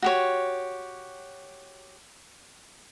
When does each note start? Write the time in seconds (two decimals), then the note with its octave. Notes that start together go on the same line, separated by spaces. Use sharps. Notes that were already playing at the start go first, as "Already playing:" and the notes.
0.02 F#4 G4 C#5